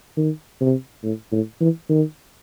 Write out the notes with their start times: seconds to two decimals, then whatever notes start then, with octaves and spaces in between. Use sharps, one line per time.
0.17 D#3
0.61 C3
1.03 A2
1.32 A2
1.61 E3
1.89 D#3